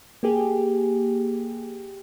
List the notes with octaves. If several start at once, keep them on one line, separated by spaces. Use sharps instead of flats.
A#3 G4 G#4